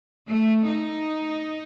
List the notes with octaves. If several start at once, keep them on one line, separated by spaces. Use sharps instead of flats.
A3
D#4